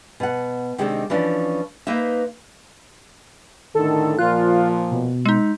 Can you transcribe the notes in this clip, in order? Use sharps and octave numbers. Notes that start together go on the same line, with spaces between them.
B2 F#5
C3 D#3 G#3 C4 D4 A4
E3 F3 C#4 D4
A#3 D#4 B4 C5 E5
A2 D3 D#3 A4
A#2 F3 F4 F#6
B2
G#3 D#4